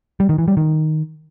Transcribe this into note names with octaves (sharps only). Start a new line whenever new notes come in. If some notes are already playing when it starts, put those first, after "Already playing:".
G3
D#3
E3
G3
D#3